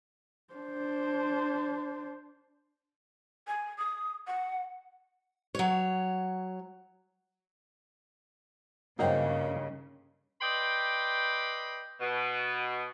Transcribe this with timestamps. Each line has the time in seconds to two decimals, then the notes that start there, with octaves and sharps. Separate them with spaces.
0.53 D4 C5
3.47 G#5
3.78 D#6
4.27 F#5
5.55 F#3 C#5
8.99 G2 C#3 F#3 A#3 C4 D#4
10.41 B4 D5 D#5 G5 B5 C6
12.01 B2